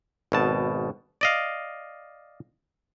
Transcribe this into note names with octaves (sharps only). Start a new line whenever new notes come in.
G#1 B2 A5
D5 D#5 F5